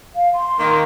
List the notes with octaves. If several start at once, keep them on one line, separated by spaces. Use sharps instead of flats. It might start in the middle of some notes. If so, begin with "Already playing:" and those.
F5
C6
D#3 A#3